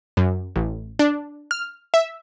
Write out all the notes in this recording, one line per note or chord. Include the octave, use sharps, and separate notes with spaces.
F#2
A1
D4
F6
E5